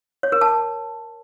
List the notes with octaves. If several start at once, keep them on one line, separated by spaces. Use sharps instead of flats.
C#5
A#4
A5